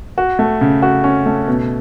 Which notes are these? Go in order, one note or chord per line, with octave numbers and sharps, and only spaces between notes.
F#4
A3
C#3
F#4
C#4
A3
B2